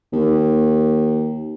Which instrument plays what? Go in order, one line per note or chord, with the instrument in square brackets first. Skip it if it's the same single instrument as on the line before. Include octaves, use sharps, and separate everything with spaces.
[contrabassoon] D#2